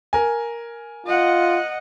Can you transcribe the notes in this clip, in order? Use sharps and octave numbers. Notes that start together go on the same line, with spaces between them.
A#4 G#5
F4 D#5 F#5